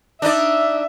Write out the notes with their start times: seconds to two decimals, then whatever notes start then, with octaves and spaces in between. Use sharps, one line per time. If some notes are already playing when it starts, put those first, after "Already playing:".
0.22 D4 D#4 D5 E5